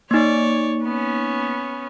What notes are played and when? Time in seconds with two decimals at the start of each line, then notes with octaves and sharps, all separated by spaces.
0.11 A#3 D#4 C#5 D5
0.83 B3 C#4